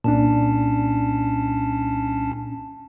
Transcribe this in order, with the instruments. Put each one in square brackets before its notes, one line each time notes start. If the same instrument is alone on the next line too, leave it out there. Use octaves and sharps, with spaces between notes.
[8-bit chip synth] C2 C#4 A5 [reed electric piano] A#2 D4